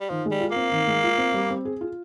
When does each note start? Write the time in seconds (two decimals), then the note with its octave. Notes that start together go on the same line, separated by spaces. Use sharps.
0.01 G3
0.09 D#3 F3
0.26 G#3
0.31 G3
0.41 F4
0.51 A#3
0.56 C4
0.72 D#3
0.88 G#3
1.04 F4
1.18 C4
1.34 G3
1.50 C4
1.65 G#4
1.81 F4